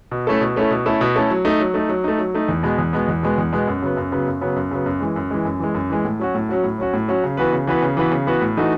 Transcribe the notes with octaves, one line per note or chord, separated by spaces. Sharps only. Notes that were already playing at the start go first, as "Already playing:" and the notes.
B2
A3 C#4 E4 A4
B2
A3 C#4 E4 A4
B2
A3 C#4 E4 A4
B2
A3 C#4 E4 A4
F#3
A3 D#4
F#3
A3 D#4
F#3
A3 D#4
F#3
A3 D#4
E2
B2 G#3 B3
E2
B2 G#3 B3
E2
B2 G#3 B3
E2
B2 G#3 B3
F#2
C#3 F#3 B3
F#2
C#3 F#3 B3
F#2
C#3 F#3 B3
F#2
C#3 F#3 B3
F#2
E3 G#3
F#2
E3 G#3
F#2
E3 G#3
F#2
E3 G#3
A2
F#3 C#4 F#4
A2
F#3 C#4 F#4
A2
F#3 C#4 F#4
A2
F#3 C#4 F#4
C#3
E3 B3 F#4 B4
C#3
E3 B3 F#4 B4
C#3
E3 B3 F#4 B4
C#3
E3 B3 F#4 B4
A2
E3 A3 D#4 F#4